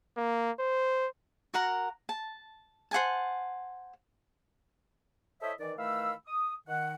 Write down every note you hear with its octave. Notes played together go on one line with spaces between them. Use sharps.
A#3
C5
F#4 A#4 F#5 A#5
A5
C5 F#5 G#5 A5
E4 A4 C5 C#5 D#5 E5
D#3 E3 D5
D#3 E3 A3 F5 B5 E6
D#6
D#3 F#5